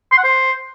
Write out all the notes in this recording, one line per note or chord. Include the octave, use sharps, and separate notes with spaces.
C6
F#5
C5